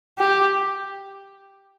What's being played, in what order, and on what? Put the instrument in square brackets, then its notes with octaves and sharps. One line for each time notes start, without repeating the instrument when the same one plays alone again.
[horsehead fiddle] G4